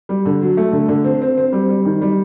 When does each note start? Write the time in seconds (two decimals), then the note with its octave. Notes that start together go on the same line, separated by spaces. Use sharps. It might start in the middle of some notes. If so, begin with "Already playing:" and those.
0.09 G3
0.25 D3
0.41 F#3
0.57 A3
0.72 D3
0.88 D3
1.04 C4
1.22 C4
1.38 C4
1.52 G3
1.69 G3
1.85 D#3
2.01 G3